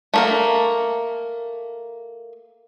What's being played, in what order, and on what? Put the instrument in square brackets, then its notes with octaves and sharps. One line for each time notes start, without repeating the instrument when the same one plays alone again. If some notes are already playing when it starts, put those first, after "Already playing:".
[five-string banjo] A3 A#3 A#4